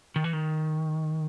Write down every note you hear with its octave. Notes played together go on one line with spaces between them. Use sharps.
D#3
E3
D#3